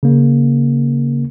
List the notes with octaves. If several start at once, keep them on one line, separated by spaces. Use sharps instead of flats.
C#3 A#3